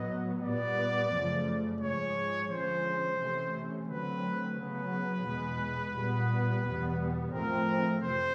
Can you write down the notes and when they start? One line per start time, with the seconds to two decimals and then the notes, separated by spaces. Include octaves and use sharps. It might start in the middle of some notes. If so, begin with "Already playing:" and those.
Already playing: A2 F#3 B3 D#5
0.43 A#2 G3 B3 D5
1.12 F#2 C#3 F3 A3
1.81 G#2 F3 G#3 C#5
2.50 D3 F3 G#3 C#4 C5
3.19 C3 E3 A3 C#4
3.88 D3 F#3 A3 C4 B4
4.57 C#3 F#3 B3 B4
5.26 E2 B2 G#3
5.96 A#2 G3 B3
6.64 E2 B2 G3 B3
7.33 A2 F3 A3 C4 A#4
8.02 F2 C3 E3 C5